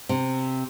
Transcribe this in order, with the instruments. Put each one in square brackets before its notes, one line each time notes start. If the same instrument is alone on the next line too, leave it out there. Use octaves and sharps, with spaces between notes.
[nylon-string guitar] C3